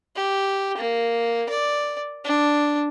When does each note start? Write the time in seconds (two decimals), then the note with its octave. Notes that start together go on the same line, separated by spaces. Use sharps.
0.16 G4
0.77 A#3
1.49 D5
2.24 D4